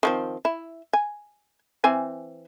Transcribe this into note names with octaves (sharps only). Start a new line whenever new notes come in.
D#3 F3 C4
E4
G#5
E3 C4 G#5